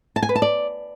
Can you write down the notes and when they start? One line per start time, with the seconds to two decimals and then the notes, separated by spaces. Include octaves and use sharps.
0.16 A5
0.23 G#5
0.29 B4
0.35 A5
0.42 D5